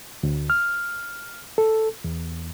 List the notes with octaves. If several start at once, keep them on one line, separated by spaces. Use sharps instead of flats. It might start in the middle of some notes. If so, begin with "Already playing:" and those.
D2
F6
A4
E2